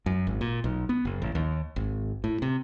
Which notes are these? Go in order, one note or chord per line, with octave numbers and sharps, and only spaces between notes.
F#2
G#1
A#2
B1
B3
F#1
A1
D#2
G#1
A2
C3